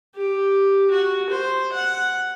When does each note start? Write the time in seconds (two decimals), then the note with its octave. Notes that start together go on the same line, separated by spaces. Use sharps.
0.16 G4
0.91 F#4
1.30 C5
1.73 F#5